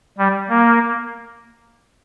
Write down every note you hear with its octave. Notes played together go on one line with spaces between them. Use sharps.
G3
A#3